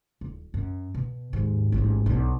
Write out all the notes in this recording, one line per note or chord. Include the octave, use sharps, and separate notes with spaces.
D#1
F#2
B2
D#2 G#2
A1 G#2
B1 D4